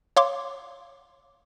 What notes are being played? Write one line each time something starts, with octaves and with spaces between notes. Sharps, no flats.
C#5 F5 C6 D6